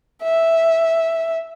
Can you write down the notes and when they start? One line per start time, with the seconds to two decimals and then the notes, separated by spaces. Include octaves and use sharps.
0.23 E5